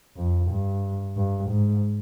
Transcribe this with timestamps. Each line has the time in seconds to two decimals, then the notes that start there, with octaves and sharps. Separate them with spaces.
0.16 F2
0.50 G2
1.16 G2
1.50 G#2